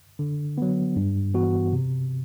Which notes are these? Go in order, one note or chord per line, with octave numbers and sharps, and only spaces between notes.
D3
F#3 B3
G2
E3 B3 F#4
C3